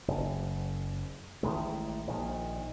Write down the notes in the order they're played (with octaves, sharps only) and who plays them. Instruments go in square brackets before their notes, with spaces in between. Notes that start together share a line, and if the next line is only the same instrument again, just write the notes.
[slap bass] F#1
A1 A2 D#3 G#3
A#1 A#2 D#3